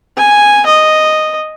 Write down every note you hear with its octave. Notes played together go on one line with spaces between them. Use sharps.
G#5
D#5